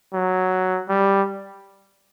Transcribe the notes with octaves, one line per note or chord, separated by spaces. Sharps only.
F#3
G3